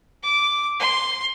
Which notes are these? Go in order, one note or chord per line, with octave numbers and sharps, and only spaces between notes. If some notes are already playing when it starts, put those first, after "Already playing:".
D6
C6